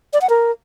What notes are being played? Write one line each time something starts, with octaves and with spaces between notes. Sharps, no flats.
D5
F#5
A#4